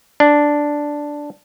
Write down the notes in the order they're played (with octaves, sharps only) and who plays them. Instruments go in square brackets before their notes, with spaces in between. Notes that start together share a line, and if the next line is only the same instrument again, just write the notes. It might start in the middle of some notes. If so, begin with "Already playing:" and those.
[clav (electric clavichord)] D4